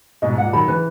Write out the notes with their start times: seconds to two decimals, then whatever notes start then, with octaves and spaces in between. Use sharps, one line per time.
0.22 G#2 B2 D#5
0.33 G#2
0.38 A#2 F#5
0.53 D#3 F#3 B5
0.68 C#3 E3 B4